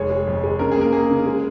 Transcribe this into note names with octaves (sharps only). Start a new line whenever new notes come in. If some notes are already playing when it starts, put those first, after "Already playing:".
Already playing: F1 G#3 C#5
G#3
F2
G#3
C#3 A#4
G#4
A#3 A#4
A#3 G#4
C#3
G#3